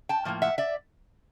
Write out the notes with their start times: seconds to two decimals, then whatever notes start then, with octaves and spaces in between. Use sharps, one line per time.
0.09 G5 A5
0.25 A2 F3 A#3
0.42 E5 F#5
0.58 D5 E5